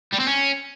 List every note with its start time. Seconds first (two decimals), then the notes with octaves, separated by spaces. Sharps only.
0.13 G3
0.20 C4
0.27 C#4